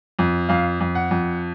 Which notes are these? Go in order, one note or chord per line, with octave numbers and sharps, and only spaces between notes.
F2
F2 F5
F2
F#5
F2